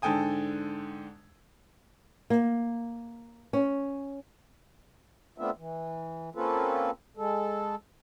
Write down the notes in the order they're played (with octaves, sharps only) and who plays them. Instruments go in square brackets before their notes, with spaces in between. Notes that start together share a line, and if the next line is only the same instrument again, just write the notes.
[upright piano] G#2 D3 A4 G5 G#5 D#6
[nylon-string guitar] A#3
C#4
[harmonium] A3 B3 C4 D4 F4 E5
E3
A#3 C4 C#4 F4 A4 B4
G#3 A4